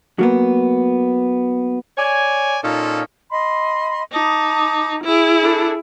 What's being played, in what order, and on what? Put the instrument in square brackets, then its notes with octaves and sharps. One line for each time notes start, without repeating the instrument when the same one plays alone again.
[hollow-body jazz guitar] F#3 A#3 B3
[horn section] C#5 D5 G#5
A#2 C#4 D#4 F4 A4
[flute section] D#5 B5 C6
[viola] D#4 [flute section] A5 D6 D#6
[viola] E4 G#4
[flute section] D4 A4 B5